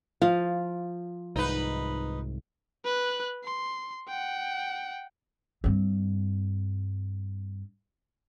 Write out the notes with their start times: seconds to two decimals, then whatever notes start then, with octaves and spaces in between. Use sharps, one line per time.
0.22 F3 F5
1.36 C2 G#2 D#4 B4
2.85 B4 F#6
3.44 C6
4.08 F#5 G5
5.64 G2 C4